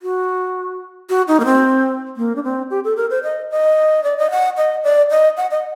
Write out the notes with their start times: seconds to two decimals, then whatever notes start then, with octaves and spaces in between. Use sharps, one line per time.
0.03 F#4
1.10 F#4
1.28 D#4
1.40 A#3
1.45 C4
2.17 A#3
2.36 D4
2.44 C4
2.70 G4
2.84 A4
2.97 A#4
3.10 C5
3.23 D#5
3.50 D#5
4.03 D5
4.18 D#5
4.31 F#5
4.57 D#5
4.84 D5
5.10 D#5
5.37 F#5
5.51 D#5